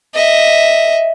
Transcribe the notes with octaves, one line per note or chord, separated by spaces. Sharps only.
D#5 E5